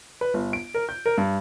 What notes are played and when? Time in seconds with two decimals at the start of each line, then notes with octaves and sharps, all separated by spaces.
0.21 B4
0.34 G1
0.53 D7
0.74 A#4
0.89 G6
1.06 A#4
1.18 G2